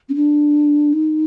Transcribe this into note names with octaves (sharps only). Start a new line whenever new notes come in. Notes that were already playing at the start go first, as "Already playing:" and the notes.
C#4
D4
D#4